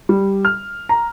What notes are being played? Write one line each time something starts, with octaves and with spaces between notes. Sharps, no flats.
G3
F6
A#5